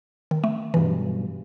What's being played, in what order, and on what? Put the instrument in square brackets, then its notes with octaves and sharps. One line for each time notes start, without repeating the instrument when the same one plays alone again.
[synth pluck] D#3
A3
[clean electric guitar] B1 G2 [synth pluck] E3